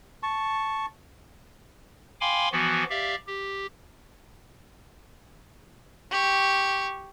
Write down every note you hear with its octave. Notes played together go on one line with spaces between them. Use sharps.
A5 C#6
F5 G5 G#5 B5 C6 D6
E3 F3 B3 F#4
G4 D5 E5 F5
G4
G4 C#6